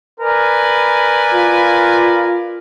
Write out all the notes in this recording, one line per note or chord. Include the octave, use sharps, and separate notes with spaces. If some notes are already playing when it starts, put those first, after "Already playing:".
A#4 B4 D5 G#5
F4